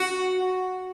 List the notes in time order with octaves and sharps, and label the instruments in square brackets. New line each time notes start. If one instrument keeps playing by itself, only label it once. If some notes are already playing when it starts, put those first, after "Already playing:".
Already playing: [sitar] F#4